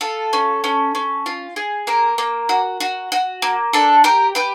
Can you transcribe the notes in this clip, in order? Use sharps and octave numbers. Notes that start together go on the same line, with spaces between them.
F4 A4
C#4
C#4
C#4
F4
G#4
A#3 A#4
A#3
F#4
F#4
F#4
A#3
D4 A4
G4 A#4
G4 B4